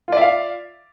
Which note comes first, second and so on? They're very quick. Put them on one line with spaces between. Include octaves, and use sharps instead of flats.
F4 D5 E5 F5